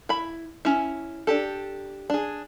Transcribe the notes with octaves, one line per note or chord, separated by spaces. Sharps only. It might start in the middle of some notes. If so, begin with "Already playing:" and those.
E4 B5
C#4 E4
D4 G4 A4
D4 G#4